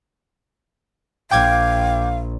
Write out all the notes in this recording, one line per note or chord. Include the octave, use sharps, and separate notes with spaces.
A#1 F5 G5 D6 G#6